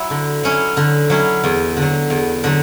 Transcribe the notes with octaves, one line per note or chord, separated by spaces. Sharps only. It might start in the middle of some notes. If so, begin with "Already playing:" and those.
Already playing: F#3 E4
D3
F#3 C#4 E4
D3
F#3 C#4 E4
E2
D3
F#3
E2
D3 F#3